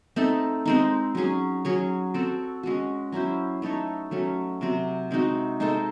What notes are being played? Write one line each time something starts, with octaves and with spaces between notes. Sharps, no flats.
A3 C4 D#4 A4
G#3 C4 D#4
F#3 C#4 G#4
F#3 C#4 G#4 C#5
C4 F#4 A4
G#3 C#4 F#4
F#3 C#4 E4 C5
A3 D#4 A4 C#5
F#3 A3 C#4
C3 F#3 C4
G#3 C4 D#4 F#4
G#3 D#4 A4 C5